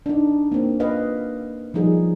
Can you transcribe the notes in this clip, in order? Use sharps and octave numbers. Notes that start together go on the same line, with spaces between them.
D4 D#4
A#3 C4
B4 D#5 F5
F3 G3 D#4 G#4